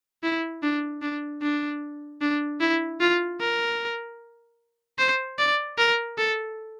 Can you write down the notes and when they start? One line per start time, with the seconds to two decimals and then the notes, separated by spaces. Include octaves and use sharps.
0.23 E4
0.63 D4
1.02 D4
1.42 D4
2.21 D4
2.61 E4
3.00 F4
3.40 A#4
4.99 C5
5.39 D5
5.78 A#4
6.18 A4